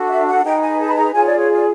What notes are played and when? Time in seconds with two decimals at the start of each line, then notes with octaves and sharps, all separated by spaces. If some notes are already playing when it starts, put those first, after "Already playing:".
Already playing: D4 F#4 A4
0.08 E5
0.27 F#5
0.43 D#4 G#4 B4 G5
0.61 G#5
0.79 A5
0.88 B5
0.95 A#5
1.13 F4 G#4 C#5 G#5
1.25 D5
1.37 C#5
1.48 D5